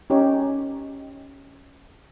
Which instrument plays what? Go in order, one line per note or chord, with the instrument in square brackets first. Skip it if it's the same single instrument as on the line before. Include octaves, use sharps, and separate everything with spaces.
[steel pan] C#4 D#4 G4 C#5